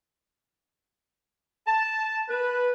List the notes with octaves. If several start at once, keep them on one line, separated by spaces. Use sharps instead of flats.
A5
B4